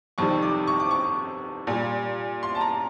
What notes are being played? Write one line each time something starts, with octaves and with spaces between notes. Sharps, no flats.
F2 C3 D#3 G3 C#6
D6
C#6
D6
C#6
A#2 G3
C6
A5
A#5